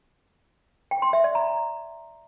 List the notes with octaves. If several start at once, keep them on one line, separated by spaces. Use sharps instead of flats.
G5
C6
E5
D5
A#5